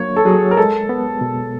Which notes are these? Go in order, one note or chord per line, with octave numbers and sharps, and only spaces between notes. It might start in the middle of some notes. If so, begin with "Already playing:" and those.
Already playing: F#3 A#3 D4 C#5
A4
F#3 G#4
A#4
G#3 A4
B3
B2